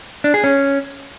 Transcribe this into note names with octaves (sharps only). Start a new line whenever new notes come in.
D4
G#4
C#4